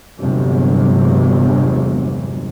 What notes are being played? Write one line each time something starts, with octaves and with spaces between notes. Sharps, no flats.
G1 E2 G2 C3 F#3 G#3